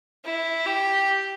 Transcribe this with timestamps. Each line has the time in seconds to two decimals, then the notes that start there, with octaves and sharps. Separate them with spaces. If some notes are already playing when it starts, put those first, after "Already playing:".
0.25 E4
0.66 G4